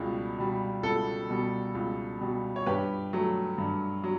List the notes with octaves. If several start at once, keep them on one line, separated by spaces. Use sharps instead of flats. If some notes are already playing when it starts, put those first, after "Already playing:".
Already playing: C#2 B2 G3
B2 G3
C#2 A4
B2 G3
C#2
B2 G3
C#5
G2 G4 B4
F#3 A3
G2
F#3